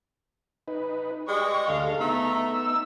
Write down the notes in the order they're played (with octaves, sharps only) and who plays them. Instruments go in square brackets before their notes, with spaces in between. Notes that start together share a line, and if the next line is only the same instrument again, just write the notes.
[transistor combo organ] D#4 B4
[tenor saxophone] G#3 [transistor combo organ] G4 D5 [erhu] C#6
[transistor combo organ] D2 A4 [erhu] F5
[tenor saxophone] A3 [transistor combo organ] B3 D#4 [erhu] A#5
[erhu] E6